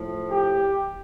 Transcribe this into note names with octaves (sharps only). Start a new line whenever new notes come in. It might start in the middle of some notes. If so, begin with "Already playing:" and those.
Already playing: A2 F3
G4